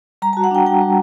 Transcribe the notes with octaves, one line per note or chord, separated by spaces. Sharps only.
G3 A#5
A5
F#4
F#5
D4 G5
G3 G5
G3